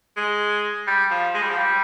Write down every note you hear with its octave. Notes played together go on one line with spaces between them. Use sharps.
G#3
G3
F3
G#3
G3
F3
G3